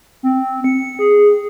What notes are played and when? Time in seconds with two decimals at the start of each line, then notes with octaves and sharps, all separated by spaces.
0.23 C4
0.64 C#7
0.99 G#4